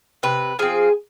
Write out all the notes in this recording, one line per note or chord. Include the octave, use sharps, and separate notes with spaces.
C3 B4
F3 C4 G#4